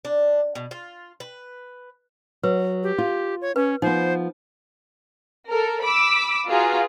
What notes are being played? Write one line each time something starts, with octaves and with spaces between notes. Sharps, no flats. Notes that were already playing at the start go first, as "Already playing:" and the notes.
D4
B2
F4
B4
F#3 B4
G4
F4
C#5
C#4 B4
F3 B3 D#4 C5
A4 A#4
B5 D6 E6 B6
F4 F#4 G#4 B4 A#5